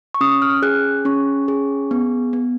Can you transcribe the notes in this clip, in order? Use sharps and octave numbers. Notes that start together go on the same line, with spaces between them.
C#6
C#4 D#6
F6
G#4 F#6
C#4 C#6
G#4
B3
B3